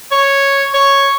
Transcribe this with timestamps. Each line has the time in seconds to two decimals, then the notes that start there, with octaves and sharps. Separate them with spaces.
0.12 C#5
0.74 C#5